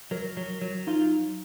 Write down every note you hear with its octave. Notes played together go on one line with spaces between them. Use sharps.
F#3 A#4
F#3
F#3
D#4 F4